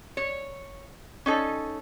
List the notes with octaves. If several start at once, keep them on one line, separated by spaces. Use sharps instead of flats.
C#5
C#4 D#4 A4